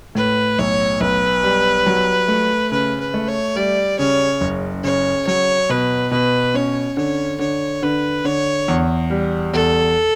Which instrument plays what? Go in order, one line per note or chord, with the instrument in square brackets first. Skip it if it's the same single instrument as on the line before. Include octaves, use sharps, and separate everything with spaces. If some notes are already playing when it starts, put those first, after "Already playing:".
[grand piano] A2 [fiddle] B4
[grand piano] B1 [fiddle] C#5
[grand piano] B1 [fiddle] B4
[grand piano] G3
F#3
A3
[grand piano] C#3 [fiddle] B4
[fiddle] B4
[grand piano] A3
[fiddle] C#5
[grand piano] G3 [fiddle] D5
[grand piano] C#3 [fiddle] C#5
[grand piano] F#1
[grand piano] C#3 [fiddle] C#5
[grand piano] F#3 [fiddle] C#5
[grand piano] B2 [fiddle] B4
[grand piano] B2 [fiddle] B4
[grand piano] C#4 [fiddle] C#5
[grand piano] D3 [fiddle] C#5
[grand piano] D3 [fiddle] C#5
[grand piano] D3 [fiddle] B4
[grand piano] D3 [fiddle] C#5
[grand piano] E2
G3
[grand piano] E2 [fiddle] A4